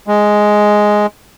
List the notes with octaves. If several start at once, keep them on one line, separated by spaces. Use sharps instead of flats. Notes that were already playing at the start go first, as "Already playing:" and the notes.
G#3